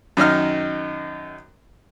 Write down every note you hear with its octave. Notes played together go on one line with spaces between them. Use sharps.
F#2 D#3 D#4 F6